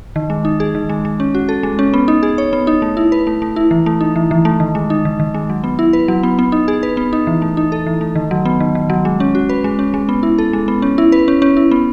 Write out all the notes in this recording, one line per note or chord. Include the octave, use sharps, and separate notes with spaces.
D#3
G#3
D#4
G#4
D#3
G#3
G#3
C#4
F#4
A4
G#3
C#4
B3
D#4
G#4
C#5
B3
D#4
A3
E4
B4
A3
A3
E4
E3
A3
D#4
E3
E3
A3
D#3
G#3
D#4
D#3
D#3
G#3
F#3
B3
E4
B4
F#3
B3
B3
D#4
G#4
B4
B3
D#4
E3
A3
D#4
A4
E3
A3
D#3
F#3
B3
D#3
D#3
F#3
G#3
C#4
F#4
B4
G#3
C#4
G#3
B3
E4
A4
G#3
B3
C#4
E4
B4
C#4
C#4
E4
B3